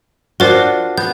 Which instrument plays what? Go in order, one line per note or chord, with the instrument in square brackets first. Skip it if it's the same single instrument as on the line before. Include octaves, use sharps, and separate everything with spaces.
[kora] D4 F4 F#4 [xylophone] A#4 C5
[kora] B3 [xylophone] G6